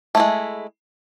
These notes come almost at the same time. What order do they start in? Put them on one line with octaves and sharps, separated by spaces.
A3 E4 G#3